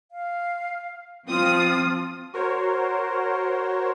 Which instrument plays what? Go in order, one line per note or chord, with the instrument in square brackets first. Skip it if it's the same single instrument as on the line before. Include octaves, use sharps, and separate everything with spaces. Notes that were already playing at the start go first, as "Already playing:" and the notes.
[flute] F5
[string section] F3 C4 D#6 [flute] F4
[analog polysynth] F#4 A#4 C5 C#5